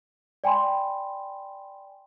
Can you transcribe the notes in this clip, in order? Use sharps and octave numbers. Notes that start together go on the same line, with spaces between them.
D5 G5 G#5 B5 C6